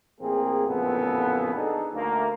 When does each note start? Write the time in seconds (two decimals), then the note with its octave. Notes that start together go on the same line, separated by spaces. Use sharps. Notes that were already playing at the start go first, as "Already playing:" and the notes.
0.20 A1 A#3 C4 G#4
0.68 A1 F2 A#2 C#3 B3 A4
1.55 D4 D#4 G#4 A4
1.94 D2 A#3